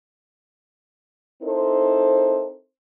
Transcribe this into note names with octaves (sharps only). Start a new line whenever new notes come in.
C4 D#4 E4 A4 A#4 C5